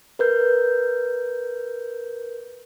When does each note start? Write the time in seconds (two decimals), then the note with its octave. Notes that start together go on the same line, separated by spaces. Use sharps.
0.19 A#4 B4 G6